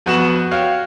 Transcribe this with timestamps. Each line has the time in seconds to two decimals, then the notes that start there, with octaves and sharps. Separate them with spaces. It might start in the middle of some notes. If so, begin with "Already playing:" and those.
0.06 F2 B3 F#4 C#6 E7 F#7
0.51 F#4 C#5 F5 G5 F6